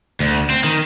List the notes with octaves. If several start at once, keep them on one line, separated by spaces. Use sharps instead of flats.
D2
C4
D#3